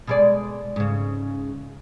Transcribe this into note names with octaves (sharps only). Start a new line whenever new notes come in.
B2 G#3 D5
G#2 C#3